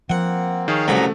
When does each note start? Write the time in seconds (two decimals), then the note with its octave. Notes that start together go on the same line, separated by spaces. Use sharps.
0.10 F3 A#3 C4 F#5
0.68 D#3 G#4 C#5 F5
0.88 C2 F#2 A3 G#4 F#5 A#5 B5